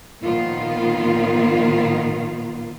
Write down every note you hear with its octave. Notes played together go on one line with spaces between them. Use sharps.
A#2 D#3 F3 B3 F4